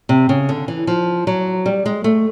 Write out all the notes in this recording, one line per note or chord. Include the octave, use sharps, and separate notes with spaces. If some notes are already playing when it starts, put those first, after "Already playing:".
C3
C#3
D3
E3
F3
F#3
G3
G#3
A3